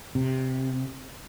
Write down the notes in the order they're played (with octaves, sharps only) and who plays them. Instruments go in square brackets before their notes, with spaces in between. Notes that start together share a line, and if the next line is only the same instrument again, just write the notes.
[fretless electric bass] C3